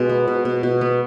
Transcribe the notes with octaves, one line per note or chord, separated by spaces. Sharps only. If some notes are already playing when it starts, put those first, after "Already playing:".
Already playing: B2 G#3
B3
B2
B2
B2
B3